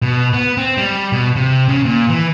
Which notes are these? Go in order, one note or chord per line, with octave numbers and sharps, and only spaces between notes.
B2
B3
C4
G3
B2
C3
C#3
A#2
E3